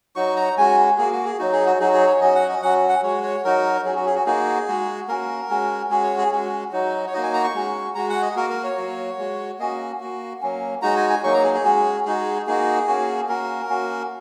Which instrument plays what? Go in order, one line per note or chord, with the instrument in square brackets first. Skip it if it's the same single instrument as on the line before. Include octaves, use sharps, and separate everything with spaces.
[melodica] F#3 D#4 F#4 C#6
A#5
G#3 C#4 F#4 G#5
A#3 F#4 G#4
F#4
G#4
F#3 D#4 F#4
G#4
F#4
F#3 D#4 F#4 G#4
G#4
C#5
F#3 C#4 F#4 D#5
F#5
D#5
F#3 C#4 F#4 F#5
F#5
G#3 F#4 C#5
C#5
F#3 D#4 F#4 A#4
F#3 C#4 F#4 G#4
F#4
G#4
F#4
A#3 D#4 F#4 G#4
G#3 F#4
A#3 C#4 F#4 A#4
G#3 C#4 F#4
G#3 C#4 F#4 G#4
C#5
G#4
G#3 C#4 F#4
F#3 D#4 F#4
C#5
A#3 D#4 F#4 D#5
G#5
A#5
C#6
G#3 C#4 F#4
G#3 F#4 A#5
F#5
D#5
A#3 F#4 A#4
A#4
C#5
F#3 A#3 F#4
G#3 F#4
A#3 C#4 F#4 D#5
A#3 F#4
F#3 A#3 C#4
G#3 D#4 F#4 A#5
G#5
G#5
F#3 A#3 D#4 C#6
A#5
G#4
G#4
G#3 C#4 F#4
G#3 D#4 F#4 G#4
A#3 D#4 F#4 G#4
A#3 C#4 F#4
A#3 C#4 F#4 A#4
A#3 C#4 F#4